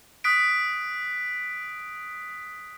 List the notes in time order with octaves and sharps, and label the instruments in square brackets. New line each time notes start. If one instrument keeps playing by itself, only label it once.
[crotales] D#6 F#6 B6 D7